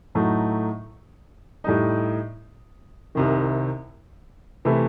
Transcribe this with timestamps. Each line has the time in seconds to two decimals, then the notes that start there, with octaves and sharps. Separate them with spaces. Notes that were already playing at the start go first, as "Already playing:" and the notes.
0.15 A2 F#3 A3 D#4
1.64 A2 G3 D#4
3.15 C2 C3 D#3
4.65 C3 E3 A3 E4 B4